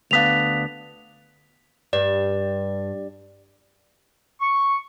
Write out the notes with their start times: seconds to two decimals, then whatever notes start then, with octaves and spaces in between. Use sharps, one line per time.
0.11 D2 B3 D4 F5 B6 F7
1.93 G2 D5
4.41 C#6